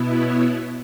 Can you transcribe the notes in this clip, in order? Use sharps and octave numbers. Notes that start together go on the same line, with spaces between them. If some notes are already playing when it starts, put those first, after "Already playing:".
Already playing: B2 B3 E4
C#5